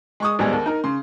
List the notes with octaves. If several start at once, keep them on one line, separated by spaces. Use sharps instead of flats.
G#3 C#6 D#6
D#1 E2 G3 G#3 G#4
D#2
D#4 A#4
C#3 C6